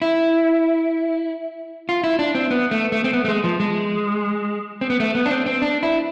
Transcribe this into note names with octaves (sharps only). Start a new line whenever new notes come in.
E4
F4
E4
D4
C4
B3
A3
A3
C4
B3
A3
G#3
F3
G#3
C4
B3
A3
B3
D4
C4
C4
D4
E4